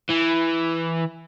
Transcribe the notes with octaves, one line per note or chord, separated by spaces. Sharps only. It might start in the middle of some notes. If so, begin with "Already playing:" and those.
E3